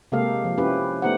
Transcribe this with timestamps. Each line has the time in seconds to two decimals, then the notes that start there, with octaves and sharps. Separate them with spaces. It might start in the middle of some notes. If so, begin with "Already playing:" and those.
0.12 C3 G#3 A#3 G4 A4 F5
0.44 F3
0.58 C#4 E4 G4 B4
1.02 A3 B3 D#4 G4 C5 F#5